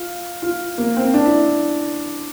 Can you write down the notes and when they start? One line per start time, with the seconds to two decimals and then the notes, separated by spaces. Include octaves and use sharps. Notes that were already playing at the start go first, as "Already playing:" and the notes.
Already playing: F4
0.42 F4
0.78 A#3
0.97 C4
1.14 D4
1.26 E4